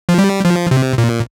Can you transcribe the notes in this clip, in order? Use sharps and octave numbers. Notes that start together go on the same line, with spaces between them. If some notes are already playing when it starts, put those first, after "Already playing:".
F3
G3
F3
C3
A#2